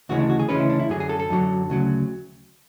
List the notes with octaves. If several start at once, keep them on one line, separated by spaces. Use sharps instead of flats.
D2 C#3 E3 G#3 C#4 F#4
D4
F#4
G#4
D2 C#3 E3 G#3 C#4 B4
E4
D4
E4
F#2 D3 F#3 G#4
G#4
A4
A4
F#2 D3 F#3
D2 C#3 F#3